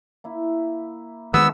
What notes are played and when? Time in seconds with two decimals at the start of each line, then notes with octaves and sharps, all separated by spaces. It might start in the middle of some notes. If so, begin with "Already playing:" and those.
0.24 A#3 E4
1.34 D#3 F3 G#3 B3 E6